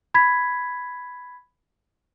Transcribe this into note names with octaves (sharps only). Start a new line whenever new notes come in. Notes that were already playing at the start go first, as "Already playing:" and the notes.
B5 G#6 B6